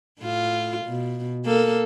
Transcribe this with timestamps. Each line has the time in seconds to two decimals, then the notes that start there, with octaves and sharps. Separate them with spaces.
0.20 A2 F4
0.85 B2
1.45 A#3 A4